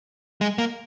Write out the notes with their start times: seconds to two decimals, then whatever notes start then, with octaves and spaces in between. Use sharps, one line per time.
0.41 G#3
0.58 A#3